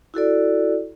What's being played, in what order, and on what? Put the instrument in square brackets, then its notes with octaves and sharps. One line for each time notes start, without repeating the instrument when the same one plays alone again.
[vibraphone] E4 F#4 A4 D5